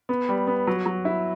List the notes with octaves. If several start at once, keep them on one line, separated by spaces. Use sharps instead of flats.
B3
G3
B3
F#3
F#3
E4